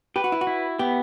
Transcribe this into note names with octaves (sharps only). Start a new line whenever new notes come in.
G4 B4
F#4
E4
F#4
E4
B3 G4